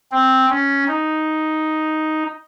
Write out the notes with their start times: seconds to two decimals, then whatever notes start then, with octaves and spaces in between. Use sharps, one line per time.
0.12 C4
0.50 C#4
0.88 D#4